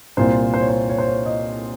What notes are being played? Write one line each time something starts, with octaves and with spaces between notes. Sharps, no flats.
C2 A#2 C5
C5
C#5
C5
C#5
C5
C#5
D#5